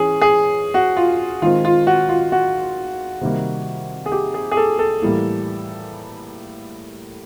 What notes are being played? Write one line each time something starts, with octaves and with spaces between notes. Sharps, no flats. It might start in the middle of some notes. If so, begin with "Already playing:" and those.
Already playing: E3 C#4 G#4
G#4
F#4
F4
D#3 G#3 C4 F4
F4
F#4
F4
F#4
C3 D#3 G3 A#3
G#4
G4
G#4
G#4
A4
A4
A2 E3 G3 A#3